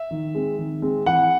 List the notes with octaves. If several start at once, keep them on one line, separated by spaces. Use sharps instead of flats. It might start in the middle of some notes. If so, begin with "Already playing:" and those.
Already playing: E5
D#3
G#3 C4
D#3
G#3 C4
E3 F#5